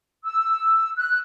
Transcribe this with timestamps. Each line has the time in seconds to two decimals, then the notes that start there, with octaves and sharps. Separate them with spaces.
0.24 E6
0.96 F#6